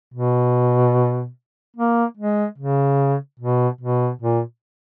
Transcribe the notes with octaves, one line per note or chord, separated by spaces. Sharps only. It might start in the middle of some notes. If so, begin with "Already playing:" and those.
B2
A#3
G#3
C#3
B2
B2
A#2